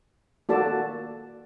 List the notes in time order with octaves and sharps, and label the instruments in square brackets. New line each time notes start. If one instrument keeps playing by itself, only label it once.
[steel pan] A#3 F#4 A4 D5 A5